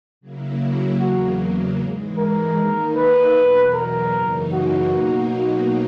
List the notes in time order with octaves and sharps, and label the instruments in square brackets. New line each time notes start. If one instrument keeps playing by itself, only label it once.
[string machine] C#3 F#3 A#3 E4
[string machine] E2 C#3 F#3 A#3 [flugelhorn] F#4
[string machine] G#2 E3 G#3
[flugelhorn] A#4
[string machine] D#3 A#3 D#4
[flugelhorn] B4
[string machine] E2 B2 F#3
[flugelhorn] A#4
[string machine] F#2 C#3 E3 A#3 D#4
[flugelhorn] F#4
[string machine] B2 F#3 A#3 D#4
[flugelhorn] F#4